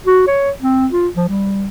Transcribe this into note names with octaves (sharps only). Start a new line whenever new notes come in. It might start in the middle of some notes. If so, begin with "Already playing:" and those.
F#4
C#5
C4
F4
F3
G3